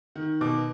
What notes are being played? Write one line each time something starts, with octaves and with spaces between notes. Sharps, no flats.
D#3
B2 D6